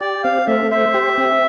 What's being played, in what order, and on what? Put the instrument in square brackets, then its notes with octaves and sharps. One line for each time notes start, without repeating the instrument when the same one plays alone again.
[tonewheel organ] G4 [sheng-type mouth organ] D5
[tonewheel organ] C4 [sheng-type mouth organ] F5
[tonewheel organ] A3 [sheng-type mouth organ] E5
[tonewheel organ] C5 [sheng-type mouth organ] E5
[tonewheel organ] G4
C4